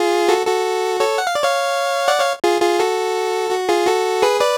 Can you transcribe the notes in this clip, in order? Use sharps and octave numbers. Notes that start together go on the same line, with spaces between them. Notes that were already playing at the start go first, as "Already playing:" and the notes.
Already playing: F4 G#4
F#4 A4
F#4 A4
A4 C#5
F#5
F5
D5
C#5 F5
D5 F#5
C#5 F5
F4 G#4
F4 G#4
F#4 A4
F#4
F4 G#4
F#4 A4
G#4 B4
B4 D5